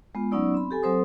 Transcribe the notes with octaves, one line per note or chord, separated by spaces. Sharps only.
G#3 B3 F4
F#3 B3 C#4 D#4 D5 E6
C4 B5
G4 A4 G#5
F#3 C4 A4 C5 C6 D#6